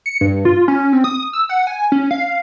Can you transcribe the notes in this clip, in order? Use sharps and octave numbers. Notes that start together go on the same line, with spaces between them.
C#7
G2
F4
C#4
C4
D#6
E6
F#5
G#5
C#4
F5